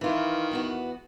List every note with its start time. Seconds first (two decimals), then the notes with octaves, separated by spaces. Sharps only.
0.01 D#3 E3 F4
0.51 E2 B3 F#4